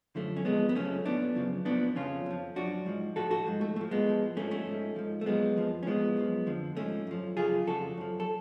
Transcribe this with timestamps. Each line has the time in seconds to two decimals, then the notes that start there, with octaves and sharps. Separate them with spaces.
0.15 F#2 D3 F3 A3
0.36 C#4
0.45 F2 F3 G#3 B3
0.69 B3
0.75 F#2 C#3 F3 A3 C#4
1.06 A2 F3 B3 D4
1.35 F#2 C#3 F3
1.65 A2 F3 B3 D4
1.95 F2 C#3 F3 C#4 F4
2.26 F2 F3
2.56 F#2 F3 D4 F#4
2.86 G#2 F3
3.16 A2 F3 F#4 A4
3.31 F#4 A4
3.46 G#2 F3
3.61 A3
3.76 A2 A3
3.81 F3
3.91 G#3 B3
4.07 A2 F3
4.37 G#2 F3 A3 C#4
4.51 A3 C#4
4.67 G#2 F3
4.96 G#2 F3
5.21 A3
5.26 F#2 F3 G#3 B3
5.57 F2 F3
5.83 C#4
5.86 A2 F3 G#3 B3
6.17 F#2 F3
6.47 F2 D3 F3
6.77 G#2 F3 A3 C#4
7.07 F#2 F3
7.37 F#2 C#3 F3 F4 G#4
7.67 F2 C#3 F3 F#4 A4
7.98 F#2 F3
8.20 A4